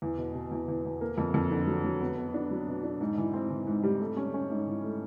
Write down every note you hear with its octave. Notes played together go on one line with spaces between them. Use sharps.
E2
B2
B2
E2
E2
E2
A#3
F2
F2
D3
F#3
F#3
B3
B3
D4
F#3
B2
D4
G#2
E3
C4
E3
G#2
G3
A3
C#4
C#4
G#2
E3
A3